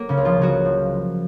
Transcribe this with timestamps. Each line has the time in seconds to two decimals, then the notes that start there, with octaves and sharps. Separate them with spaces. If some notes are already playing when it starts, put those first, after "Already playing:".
Already playing: F#3 A#3
0.09 C#3 C#4
0.17 C#2
0.25 F3 F4
0.40 C#3 F#3 F#4
0.65 F3